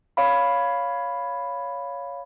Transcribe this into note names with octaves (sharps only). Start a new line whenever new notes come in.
C#5 F5 B5